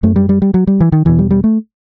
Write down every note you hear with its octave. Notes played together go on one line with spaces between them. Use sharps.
F#2 A3
G3
G3
G3
F#3
G3
E3
D#3
E2 B2 E3
G3
G3
A3